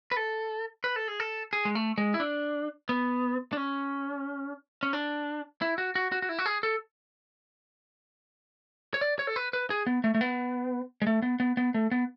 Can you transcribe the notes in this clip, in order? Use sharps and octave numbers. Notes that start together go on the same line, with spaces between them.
B4
A4
B4
A4
G#4
A4
G#4
G#3
A3
G#3
E4
D4
B3
D4
C#4
C#4
D4
E4
F#4
F#4
F#4
F#4
E4
F#4
G#4
A4
C#5
D5
C#5
A4
B4
B4
G#4
B3
A3
A3
B3
G#3
A3
B3
B3
B3
A3
B3